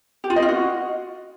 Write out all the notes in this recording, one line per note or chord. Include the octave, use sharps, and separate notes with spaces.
G4
F4
D#5
F4
F#4